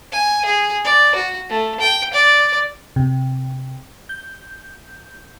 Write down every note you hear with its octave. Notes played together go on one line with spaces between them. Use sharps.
G#5
G#4
D5
F#4
A3
G5
D5
C3
G6